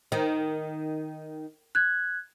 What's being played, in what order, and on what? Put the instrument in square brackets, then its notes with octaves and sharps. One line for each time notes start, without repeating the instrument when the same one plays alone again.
[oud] D#3
[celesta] F#6 G#6